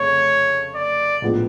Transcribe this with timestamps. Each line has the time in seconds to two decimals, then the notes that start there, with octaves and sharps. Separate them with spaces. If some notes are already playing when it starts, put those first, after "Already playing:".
Already playing: F1 C#3 A3 C#5
0.75 D5
1.22 A#1 A2 F3 G#3 B3